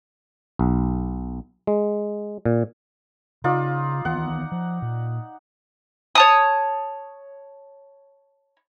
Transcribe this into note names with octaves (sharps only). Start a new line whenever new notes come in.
B1
G#3
A#2
C#3 D#4 F4 D5
D#3 E3 B3 F#5
F3
A#2
C#5 A5 D#6